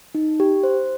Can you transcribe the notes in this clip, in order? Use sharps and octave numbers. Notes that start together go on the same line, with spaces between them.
D#4
G4
C5